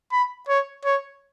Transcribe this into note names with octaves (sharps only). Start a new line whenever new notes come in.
B5
C#5
C#5